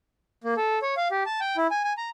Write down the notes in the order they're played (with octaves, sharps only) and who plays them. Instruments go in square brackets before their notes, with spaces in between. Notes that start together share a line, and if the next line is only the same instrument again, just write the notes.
[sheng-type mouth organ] A#3
A4
C#5
F5
G4
A5
G5
E4
G#5
G#5
A#5